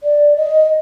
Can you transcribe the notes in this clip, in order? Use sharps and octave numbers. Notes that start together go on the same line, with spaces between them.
D5
D#5